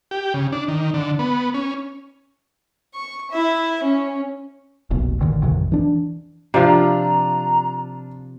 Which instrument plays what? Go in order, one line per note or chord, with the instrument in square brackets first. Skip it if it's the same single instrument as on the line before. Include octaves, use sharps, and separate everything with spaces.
[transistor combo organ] G4
C#3
D4
D#3
D3
B3
C#4
[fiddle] C#6
E4 E5
C#4
[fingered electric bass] F1 B1 A#2
A1 D3 D#3
A1 F2 C3 D#3
E3 D4
[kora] C3 F3 [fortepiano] D4 F4 [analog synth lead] A#5